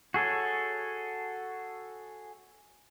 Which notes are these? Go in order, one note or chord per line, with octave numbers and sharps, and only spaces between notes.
F#4 G#4 A4 C#5